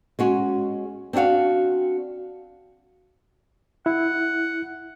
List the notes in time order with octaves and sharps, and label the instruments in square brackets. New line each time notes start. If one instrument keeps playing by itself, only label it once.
[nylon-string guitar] G#3 C#4 F#4
C4 D4 E4 F#4 F5
[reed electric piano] E4 [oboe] F#5